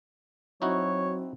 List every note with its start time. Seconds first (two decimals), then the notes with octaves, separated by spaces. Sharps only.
0.62 F#3 C4 D#4 E4 F#4 C#5